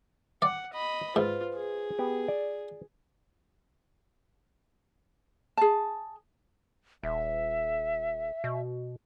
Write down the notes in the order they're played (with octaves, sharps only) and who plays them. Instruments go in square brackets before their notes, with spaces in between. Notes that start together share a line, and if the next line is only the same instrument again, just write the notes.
[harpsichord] D5 [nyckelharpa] F#5 [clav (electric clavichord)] G5
[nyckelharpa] D#5 B5
[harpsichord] G#2 [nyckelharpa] F4 [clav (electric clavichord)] B4 C5
[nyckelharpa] G#4
[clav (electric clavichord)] B3 G4
D5
[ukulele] G#4 A5
[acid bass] D#1 [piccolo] E5
[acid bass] B2